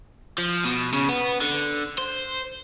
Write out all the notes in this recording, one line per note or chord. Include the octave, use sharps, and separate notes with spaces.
F3
B2
C#3
B3
D3
C5